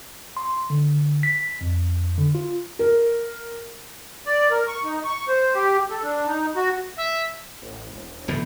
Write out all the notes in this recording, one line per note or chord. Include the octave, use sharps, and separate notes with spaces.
C6
D3
B6
F2
D3
F4
A#4
D5
A#4
C#6
D#4
C#6
C5
G4
A4
D4
D#4
F#4
E5
A1
E1
A#1 A2 D3 E3 B3